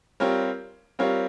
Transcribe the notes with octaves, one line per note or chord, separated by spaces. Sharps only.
G3 C4 F4 A#4 C#5
G3 C4 F4 A#4 C#5